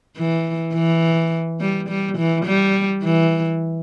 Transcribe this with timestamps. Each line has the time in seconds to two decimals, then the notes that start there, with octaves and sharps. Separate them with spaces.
0.17 E3
0.74 E3
1.61 G3
1.89 G3
2.18 E3
2.46 G3
3.04 E3